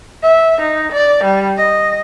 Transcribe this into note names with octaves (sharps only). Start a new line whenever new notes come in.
E5
D#4
D5
G3
D#5